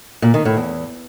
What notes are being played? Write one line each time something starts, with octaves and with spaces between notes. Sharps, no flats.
A#2
D#3
A2
E2